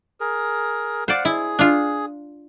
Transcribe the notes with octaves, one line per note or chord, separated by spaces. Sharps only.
G#4 A#4
C5 D5 F5 F#5
E4 G#4
D4 F4